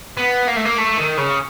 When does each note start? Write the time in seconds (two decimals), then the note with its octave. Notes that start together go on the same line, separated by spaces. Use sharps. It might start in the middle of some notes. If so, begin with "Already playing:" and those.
0.17 B3
0.48 A#3
0.57 A3
0.65 A#3
0.78 A3
0.97 D#3
1.17 C#3